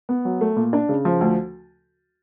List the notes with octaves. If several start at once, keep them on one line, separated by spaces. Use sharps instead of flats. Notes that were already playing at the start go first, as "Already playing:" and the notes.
B3
F#3
A3
A#2
D4
C#3
F3
D2